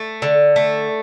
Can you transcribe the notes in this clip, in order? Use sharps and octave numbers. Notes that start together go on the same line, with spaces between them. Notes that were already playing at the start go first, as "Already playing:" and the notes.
Already playing: A3
D3
A3